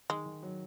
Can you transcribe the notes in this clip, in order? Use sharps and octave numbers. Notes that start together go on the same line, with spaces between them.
D#3 G#3
D#3
F#3